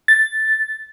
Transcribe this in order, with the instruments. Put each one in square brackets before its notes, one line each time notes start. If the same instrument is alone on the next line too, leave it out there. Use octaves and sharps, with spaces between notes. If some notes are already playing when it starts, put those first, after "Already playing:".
[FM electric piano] A6